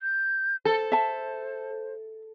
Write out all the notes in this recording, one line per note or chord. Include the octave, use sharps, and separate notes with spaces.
G6
A4 C5
E5 A5